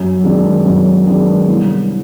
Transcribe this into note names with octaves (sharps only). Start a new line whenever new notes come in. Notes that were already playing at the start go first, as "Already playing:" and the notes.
Already playing: F#2
D#3 G#3 B3 D4
F#2
D#3 G#3 B3 D4
C2